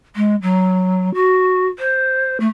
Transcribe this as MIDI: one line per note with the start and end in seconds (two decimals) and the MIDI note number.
0.16 0.35 56
0.42 1.12 54
1.14 1.67 66
1.79 2.37 72
2.40 2.47 57